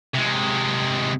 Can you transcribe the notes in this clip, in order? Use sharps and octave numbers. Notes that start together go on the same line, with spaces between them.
C3 G#3